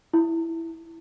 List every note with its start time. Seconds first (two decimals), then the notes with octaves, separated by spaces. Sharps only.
0.13 E4